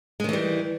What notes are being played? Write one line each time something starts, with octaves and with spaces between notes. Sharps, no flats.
D#3 E3 G3 G#3